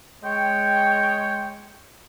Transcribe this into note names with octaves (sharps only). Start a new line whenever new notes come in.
G#3 C#5 G5